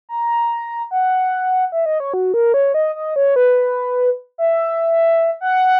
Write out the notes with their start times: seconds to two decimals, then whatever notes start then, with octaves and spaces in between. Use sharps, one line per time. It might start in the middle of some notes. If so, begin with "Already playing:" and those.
0.09 A#5
0.91 F#5
1.72 E5
1.86 D#5
2.00 C#5
2.14 F#4
2.34 A#4
2.54 C#5
2.74 D#5
2.95 D#5
3.16 C#5
3.36 B4
4.38 E5
5.41 F#5